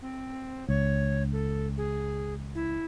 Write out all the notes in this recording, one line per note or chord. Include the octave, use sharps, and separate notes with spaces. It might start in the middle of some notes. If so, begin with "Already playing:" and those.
C4
C#2 C#5
A4
G#4
E4